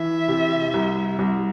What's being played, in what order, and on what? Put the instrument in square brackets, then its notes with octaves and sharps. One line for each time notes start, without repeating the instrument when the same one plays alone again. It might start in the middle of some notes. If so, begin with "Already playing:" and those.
Already playing: [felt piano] E3 [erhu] E5
[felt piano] C3
C2
C2